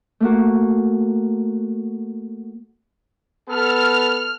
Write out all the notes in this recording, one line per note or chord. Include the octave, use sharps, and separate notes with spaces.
A3 A#3 F#4
B3 A4 F6